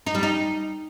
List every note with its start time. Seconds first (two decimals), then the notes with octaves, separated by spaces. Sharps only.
0.06 D#4
0.15 G3
0.23 D#4